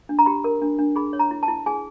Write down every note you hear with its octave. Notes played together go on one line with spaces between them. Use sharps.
D4
A#5
G4 B5
A#4
D4
D4
G#4 B5
C#5
A#5
E4
A5
E4
G#4 G#5